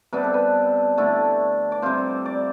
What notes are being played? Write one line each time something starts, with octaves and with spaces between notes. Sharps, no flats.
C3 G3 B3 D4 B4
A4
B4
D3 A3 E4
D5
C3 G3 C4 F4 C5
D5